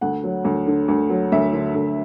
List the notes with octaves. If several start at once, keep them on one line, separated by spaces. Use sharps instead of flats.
D2 F#5
F#3
D2
D3
D2
F#3
D2 E5
D3
D2